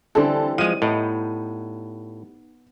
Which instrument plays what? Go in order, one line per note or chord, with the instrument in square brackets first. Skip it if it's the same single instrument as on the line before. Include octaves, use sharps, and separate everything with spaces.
[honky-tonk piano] D3 A4 [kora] E3 G3 C4
[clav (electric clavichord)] F3 G#3 [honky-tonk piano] D#7
[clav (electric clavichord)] A2 [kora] B3 D#4